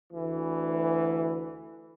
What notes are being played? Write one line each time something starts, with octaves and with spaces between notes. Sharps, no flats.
D2 E3